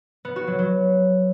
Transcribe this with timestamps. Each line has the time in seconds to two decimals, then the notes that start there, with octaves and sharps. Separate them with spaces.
0.25 B3
0.36 F#4
0.47 F#3
0.59 F#3